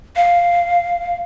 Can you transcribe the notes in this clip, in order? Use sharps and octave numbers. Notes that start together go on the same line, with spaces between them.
F5